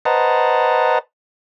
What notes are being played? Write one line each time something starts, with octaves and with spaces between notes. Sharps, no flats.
B4 C5 D#5 F#5 A5 A#5